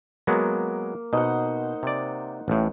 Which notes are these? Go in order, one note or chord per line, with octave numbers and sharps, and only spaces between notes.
F#3 G#3 A#3 B3
B2 D#4 C5 F#5
C3 D5
A1 A2